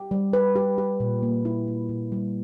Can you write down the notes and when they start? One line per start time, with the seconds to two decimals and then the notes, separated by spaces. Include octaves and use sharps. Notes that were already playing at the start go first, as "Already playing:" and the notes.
Already playing: G4
0.11 G3
0.33 B4
0.56 G4
0.78 G4
1.00 A#2
1.23 A#3
1.45 E4
1.68 A#3
1.89 A#2
2.12 G3